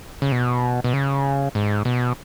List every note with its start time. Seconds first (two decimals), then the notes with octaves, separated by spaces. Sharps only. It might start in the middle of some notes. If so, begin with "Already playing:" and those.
0.22 C#3
0.32 B2
0.84 B2
0.93 C#3
1.55 G#2
1.85 B2